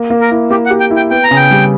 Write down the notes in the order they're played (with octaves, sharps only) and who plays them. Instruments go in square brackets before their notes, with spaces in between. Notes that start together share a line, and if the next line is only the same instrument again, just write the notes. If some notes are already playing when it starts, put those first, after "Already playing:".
Already playing: [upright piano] A#3
A#3
[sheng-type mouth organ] A#4
[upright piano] E4
[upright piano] A#3 [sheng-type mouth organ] G4
[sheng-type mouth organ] F#5
[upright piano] G4
[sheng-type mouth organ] G5
[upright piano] E4
[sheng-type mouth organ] G5
[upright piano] B3 [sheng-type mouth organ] G5
[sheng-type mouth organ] A#5
[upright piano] C#3
[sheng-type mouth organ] G5
[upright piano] G3